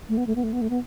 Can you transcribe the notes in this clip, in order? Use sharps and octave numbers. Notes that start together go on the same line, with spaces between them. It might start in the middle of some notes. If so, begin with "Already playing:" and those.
A3
B3
A3
B3
A3
B3
A3
B3